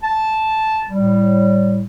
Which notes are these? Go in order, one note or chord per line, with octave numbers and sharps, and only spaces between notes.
A5
A2 G3